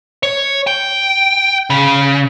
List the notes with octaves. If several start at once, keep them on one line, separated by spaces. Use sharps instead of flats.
C#5
G5
C#3